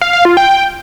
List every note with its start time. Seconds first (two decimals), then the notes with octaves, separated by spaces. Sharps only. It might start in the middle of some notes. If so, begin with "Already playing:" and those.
0.01 F5
0.13 F5
0.25 F4
0.37 G5